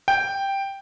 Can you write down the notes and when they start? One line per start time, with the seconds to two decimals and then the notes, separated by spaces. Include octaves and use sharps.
0.08 G5